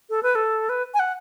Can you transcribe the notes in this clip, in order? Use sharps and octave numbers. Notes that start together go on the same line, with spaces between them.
A4
B4
A4
B4
G#5
F#5